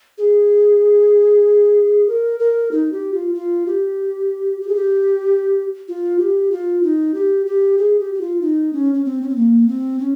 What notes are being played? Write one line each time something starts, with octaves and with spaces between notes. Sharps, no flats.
G#4
A#4
A#4
D#4
G4
F4
F4
G4
G4
G#4
G4
F4
G4
F4
D#4
G4
G4
G#4
G4
G4
F4
D#4
C#4
C#4
C4
C#4
C4
A#3
C4
C#4